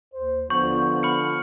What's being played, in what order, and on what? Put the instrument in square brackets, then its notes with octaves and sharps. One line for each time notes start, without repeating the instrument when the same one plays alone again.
[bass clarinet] D#2 [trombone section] C5
[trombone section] D3 F3 [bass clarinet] B3 [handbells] C#6 [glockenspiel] G6
[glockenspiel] B5 F6 C#7